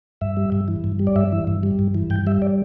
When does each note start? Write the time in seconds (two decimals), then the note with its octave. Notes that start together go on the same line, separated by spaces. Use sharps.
0.21 G2 E5
0.37 G3
0.52 G2
0.68 E3
0.84 G2
0.99 G3
1.07 D5
1.16 G2 E5
1.32 E3
1.47 G2
1.63 G3
1.79 G2
1.95 E3
2.10 G2 G5
2.27 G3 E5
2.42 D5